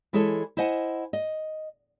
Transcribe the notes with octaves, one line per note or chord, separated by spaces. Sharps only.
E3 G#3 E4 G#4 A4 C#5
E4 C5 D#5 F#5 G#5
D#5